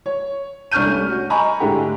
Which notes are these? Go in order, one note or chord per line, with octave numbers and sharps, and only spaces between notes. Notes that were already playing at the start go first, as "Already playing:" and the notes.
C#5
C2 D4 C#6 F6 G6 D#7
G3 A3 C#4
F#4
D#5 G#5 A#5 B5 C#6
G#2 D3 G#3 A3 E4 G4